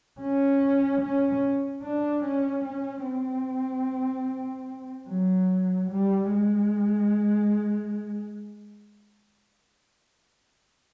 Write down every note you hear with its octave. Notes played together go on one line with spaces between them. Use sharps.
C#4
C#4
D4
C#4
C#4
C4
F#3
G3
G#3